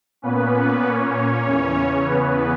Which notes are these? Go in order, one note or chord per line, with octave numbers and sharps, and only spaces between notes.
A#2 A#3 B3 C#4 B4
C#4 C#5
E2 C#3 E3
B3 B4